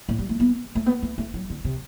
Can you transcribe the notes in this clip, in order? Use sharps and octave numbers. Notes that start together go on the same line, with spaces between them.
A2
G3
A3
B3
A3
B3
A3
A3
F#3
D3
C3